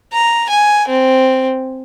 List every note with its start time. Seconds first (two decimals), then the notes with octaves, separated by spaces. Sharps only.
0.13 A#5
0.49 G#5
0.88 C4